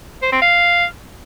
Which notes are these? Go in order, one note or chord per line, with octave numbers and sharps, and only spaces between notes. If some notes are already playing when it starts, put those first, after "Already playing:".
C5
C4
F5